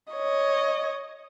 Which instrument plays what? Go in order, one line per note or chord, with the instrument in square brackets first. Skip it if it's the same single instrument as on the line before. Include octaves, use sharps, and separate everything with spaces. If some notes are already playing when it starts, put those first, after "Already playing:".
[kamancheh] C#5 D#5